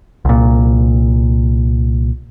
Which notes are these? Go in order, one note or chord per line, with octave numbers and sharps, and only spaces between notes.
C2 A#2